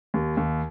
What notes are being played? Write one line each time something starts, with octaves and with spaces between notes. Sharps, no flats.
D#2
D#2